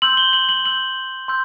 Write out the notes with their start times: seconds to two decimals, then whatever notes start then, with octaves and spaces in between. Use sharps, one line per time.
0.02 C6 E6 G6 F#7
0.17 G7
0.33 F#7
0.49 F#7
0.64 C6 E6 G6 F#7
1.28 C6 E6 G6